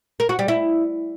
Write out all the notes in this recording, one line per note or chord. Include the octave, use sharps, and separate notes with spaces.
A#4
F#4
G3
E4